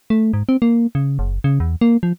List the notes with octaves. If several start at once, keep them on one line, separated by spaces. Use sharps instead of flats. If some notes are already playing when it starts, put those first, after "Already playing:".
A3
G#2
C4
A#3
C#3
F#1
C#3
E2
A#3
F3